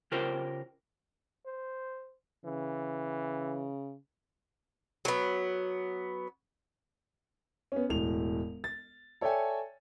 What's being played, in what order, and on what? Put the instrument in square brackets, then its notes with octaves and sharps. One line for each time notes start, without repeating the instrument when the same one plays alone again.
[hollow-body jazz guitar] C#3 F4 G4 A#4 C5
[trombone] C5
[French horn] C#3 [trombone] E3
[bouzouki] F#3 B3
[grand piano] B3 C#4
E1 A2 F7
A6
A4 C#5 D5 E5 G5 G#5